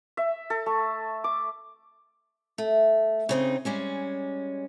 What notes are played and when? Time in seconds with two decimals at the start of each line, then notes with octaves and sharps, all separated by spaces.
0.17 E5
0.50 A4
0.66 A3
1.24 D6
2.58 A3
3.29 C#3 C4 D#4
3.65 G3 G#3 C#4